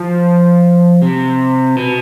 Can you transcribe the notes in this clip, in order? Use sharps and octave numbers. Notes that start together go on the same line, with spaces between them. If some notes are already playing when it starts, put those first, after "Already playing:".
Already playing: F3
C3
B2